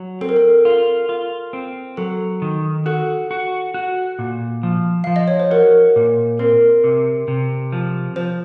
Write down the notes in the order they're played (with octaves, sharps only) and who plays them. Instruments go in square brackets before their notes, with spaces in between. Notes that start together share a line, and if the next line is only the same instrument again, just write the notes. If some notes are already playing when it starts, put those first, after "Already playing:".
Already playing: [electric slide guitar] F#3
[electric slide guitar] C4 [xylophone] A4
[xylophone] A#4
A4
[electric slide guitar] F4
F4
C4
[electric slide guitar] F#3 [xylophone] A4
[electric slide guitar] D#3
[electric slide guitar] F#4 [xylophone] A4
[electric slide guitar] F#4
F#4
A#2
F3
[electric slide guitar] F3 [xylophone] F5
[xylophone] D#5
C#5
C5
[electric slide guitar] F#4 [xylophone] A#4
[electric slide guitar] A#2
[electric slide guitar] C4 [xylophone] A#4
[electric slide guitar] C3
C3
F3
[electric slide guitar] F3 [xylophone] C5